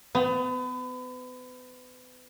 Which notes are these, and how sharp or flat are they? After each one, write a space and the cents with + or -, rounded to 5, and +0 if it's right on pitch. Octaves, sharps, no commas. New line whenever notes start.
B3 +35